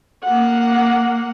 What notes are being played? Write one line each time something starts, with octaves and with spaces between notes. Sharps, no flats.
A#3 F#5